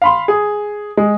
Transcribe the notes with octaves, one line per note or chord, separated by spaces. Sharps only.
F5 B5 C6
G#4
G#3